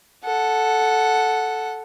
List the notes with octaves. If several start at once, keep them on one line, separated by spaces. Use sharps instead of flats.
A4 F#5